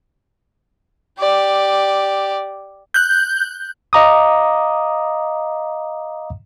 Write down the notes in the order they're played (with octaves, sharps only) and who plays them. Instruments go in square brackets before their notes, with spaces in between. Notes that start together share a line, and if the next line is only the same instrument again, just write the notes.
[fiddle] G4 D5
[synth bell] F#6 G6
[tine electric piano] D#5 F5 A#5 D6 D#6